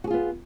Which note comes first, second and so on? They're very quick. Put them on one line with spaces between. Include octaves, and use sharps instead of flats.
F#4 G#4 F4 B3